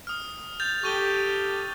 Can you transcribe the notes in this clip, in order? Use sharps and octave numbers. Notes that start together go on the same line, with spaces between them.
D#6 F6
G6 A6 F7
G4 A4 C#6 D#7 G7